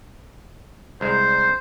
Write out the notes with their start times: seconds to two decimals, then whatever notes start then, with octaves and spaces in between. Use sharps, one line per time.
1.01 C2 G#3 C5